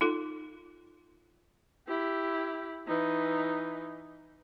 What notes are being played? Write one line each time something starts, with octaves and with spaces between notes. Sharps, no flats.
D#4 F4 A4
E4 G4
E3 D#4